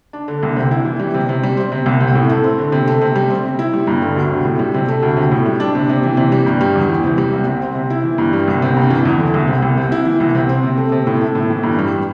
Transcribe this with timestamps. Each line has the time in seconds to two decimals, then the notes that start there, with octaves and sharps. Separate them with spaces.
0.13 D4
0.28 D3
0.43 C2
0.56 C3
0.71 E4
0.85 E3
0.99 G3
1.14 C3
1.29 C3
1.43 G3
1.57 C4
1.72 C3
1.86 C2
2.00 C3
2.15 A2
2.29 A3
2.44 C4
2.59 D3
2.72 C3
2.87 A3
3.01 C3
3.16 G3
3.30 C4
3.44 C3
3.59 E4
3.73 G3
3.87 G2
4.02 D3
4.16 D2
4.31 C3
4.45 A2
4.59 G3
4.74 C3
4.88 A3
5.02 D2
5.17 C3
5.31 A2
5.46 G3
5.60 D4
5.75 C3
5.89 C3
6.03 E3
6.17 C3
6.32 G3
6.46 G2
6.61 G3
6.75 E2
6.89 E3
7.04 C3
7.18 G3
7.33 C2
7.47 C3
7.62 C4
7.75 C3
7.90 E4
8.04 E3
8.18 G2
8.33 G3
8.48 C2
8.62 C3
8.77 G2
8.90 E3
9.05 E2
9.20 D3
9.34 C2
9.48 C3
9.62 C2
9.77 C3
9.92 E4
10.05 E3
10.20 C2
10.35 C3
10.49 C4
10.63 C3
10.77 A3
10.92 C3
11.07 A2
11.21 A3
11.35 A2
11.50 E3
11.63 G2
11.79 G3